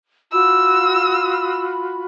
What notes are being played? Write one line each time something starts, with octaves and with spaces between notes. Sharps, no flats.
F4 F#4 B5 E6